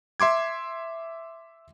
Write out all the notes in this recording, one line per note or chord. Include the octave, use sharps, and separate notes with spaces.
E5 C6 D6 G#6